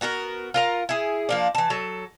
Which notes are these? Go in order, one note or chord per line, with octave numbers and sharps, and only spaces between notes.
B3 F#4 A4 A#4
F4 A#4 A#5
E4 G#4
F3 A#3 D4
E3 A5
F#3 A4